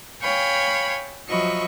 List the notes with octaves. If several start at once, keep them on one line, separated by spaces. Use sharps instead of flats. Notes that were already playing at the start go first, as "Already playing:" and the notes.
C#5 F5 G5 G#5 B5
F3 F#3 D#5 E5 B5 C#6